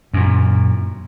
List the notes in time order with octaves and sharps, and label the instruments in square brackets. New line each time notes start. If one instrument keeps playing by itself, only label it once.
[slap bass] F#2 A#2